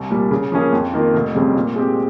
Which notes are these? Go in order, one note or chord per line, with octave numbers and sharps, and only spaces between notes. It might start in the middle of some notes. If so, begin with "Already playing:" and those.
Already playing: C2
A#2 G3
C#3
F3 A#3 C#4 G#4
F2
D#3 A#3 F4
F1
F2 C#3 G3 C4
A#2
G#3 C4 G4